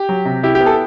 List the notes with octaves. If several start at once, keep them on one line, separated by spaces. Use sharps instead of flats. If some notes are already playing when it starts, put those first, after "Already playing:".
Already playing: G4
F#3
C3
E4 G4
G4
B3
A4